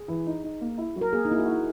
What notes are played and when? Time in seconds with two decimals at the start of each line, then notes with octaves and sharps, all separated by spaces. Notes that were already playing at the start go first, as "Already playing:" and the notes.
Already playing: G#4
0.08 E3
0.27 D#4
0.43 D#4
0.61 A#3
0.78 E4
0.96 F#3
1.01 A#4
1.13 A#3 G#4
1.25 D#4
1.31 A#3 E4
1.39 F#4
1.47 E4